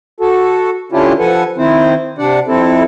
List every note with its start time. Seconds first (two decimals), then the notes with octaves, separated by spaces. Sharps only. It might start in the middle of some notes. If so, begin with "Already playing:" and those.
0.20 F#4 A4
0.92 D3 C#4 D4 E4 F4 G4
1.20 F3 A4 B4 F#5 G#5
1.58 D#3 C4 E4 C5
2.18 C3 D4 D5 F#5
2.48 F2 C4 E4 A4